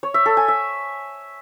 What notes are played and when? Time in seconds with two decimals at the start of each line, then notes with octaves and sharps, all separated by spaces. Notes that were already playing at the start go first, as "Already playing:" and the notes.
0.03 C#5
0.14 E5
0.26 A4
0.37 G#5
0.48 E5